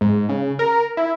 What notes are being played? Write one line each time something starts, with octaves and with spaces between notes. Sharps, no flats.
G#2
C#3
A#4
E4